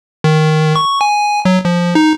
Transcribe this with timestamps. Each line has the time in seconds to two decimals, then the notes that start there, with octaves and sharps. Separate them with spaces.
0.24 D#3
0.76 C#6
1.01 G#5
1.45 F#3
1.65 F3
1.95 D#4